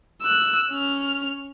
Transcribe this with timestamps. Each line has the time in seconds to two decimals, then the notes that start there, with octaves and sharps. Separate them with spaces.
0.22 E6 F#6
0.71 C#4 F6